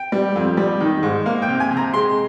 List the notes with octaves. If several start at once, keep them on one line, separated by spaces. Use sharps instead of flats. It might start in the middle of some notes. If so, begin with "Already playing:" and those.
Already playing: G5
G3
F2
G3
D#3
G#2
A#3 F5
G5
C3
G#5
C3
A#5
G#3 C6